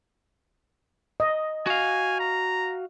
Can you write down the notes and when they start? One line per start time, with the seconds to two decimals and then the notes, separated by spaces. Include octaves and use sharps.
1.20 D#5
1.67 F#4 F5 G#5
2.20 A#5